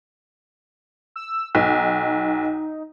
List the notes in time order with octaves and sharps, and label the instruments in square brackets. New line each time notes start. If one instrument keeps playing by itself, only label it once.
[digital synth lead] E6
[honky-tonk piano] B1 [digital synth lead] D#4